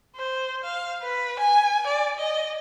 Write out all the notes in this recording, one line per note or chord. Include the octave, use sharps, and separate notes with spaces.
C5
F5
B4
G#5
D5
D#5